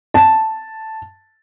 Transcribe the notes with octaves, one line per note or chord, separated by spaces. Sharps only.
A5